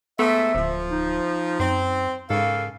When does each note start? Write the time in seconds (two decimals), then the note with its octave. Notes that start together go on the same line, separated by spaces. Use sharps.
0.19 G#2 A3 B3 E5
0.55 D1 F3
0.91 D#4
1.60 F#2 C4
2.30 G#2 C#3 A#3 A4 F5